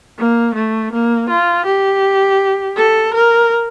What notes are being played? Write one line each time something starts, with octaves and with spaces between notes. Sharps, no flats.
A#3
A3
A#3
F4
G4
A4
A#4